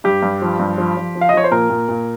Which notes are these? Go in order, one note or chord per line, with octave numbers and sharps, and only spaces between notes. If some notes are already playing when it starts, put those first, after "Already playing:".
G2 G4
G2
F3
G2
F3
F3
F3
F5
D#5
F3 C#5
C5
A#2 A#4
A#2
A#2